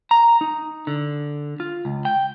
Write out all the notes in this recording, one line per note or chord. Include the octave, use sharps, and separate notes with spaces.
A#5
D#4
D3
F4
C#2
G5